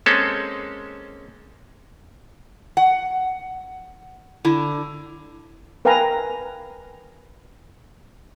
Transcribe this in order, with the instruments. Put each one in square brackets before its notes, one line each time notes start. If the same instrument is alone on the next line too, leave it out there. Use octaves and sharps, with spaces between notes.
[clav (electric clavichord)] G#3 A#3 C4 C#4 A4
[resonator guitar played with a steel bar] F#5
D3 E4
[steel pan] A#4 B4 F5 G5 G#5 A#5